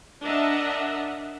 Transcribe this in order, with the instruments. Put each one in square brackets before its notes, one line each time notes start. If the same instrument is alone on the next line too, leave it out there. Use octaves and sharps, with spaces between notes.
[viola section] D4 A#4 D#5 E5 F#5